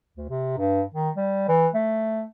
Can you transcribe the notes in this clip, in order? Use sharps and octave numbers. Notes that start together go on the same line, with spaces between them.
D2
C3
G2
D#3
G3
E3
A3